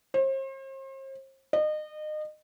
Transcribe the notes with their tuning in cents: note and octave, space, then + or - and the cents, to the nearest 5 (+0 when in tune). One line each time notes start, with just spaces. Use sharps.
C5 +40
D#5 -30